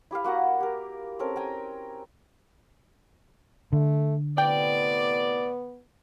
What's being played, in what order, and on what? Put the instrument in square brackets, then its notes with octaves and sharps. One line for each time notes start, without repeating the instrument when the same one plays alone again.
[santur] E4 G4 B4 F5
A#3 F#4 F#5 A#5
G4 A#4
C4 C#4 A4 A#4
G5 G#5 A#5
[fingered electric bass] D3 [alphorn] A3
[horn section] A2 C3 D5 [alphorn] B3 [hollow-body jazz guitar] G5